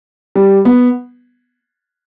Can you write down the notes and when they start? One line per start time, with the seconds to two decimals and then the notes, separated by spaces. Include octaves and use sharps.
0.36 G3
0.65 B3